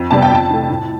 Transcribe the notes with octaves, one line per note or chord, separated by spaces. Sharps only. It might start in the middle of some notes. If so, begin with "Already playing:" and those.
Already playing: F2
C3 G3 B3 A5
G5
F2 A5
E3 A3
A2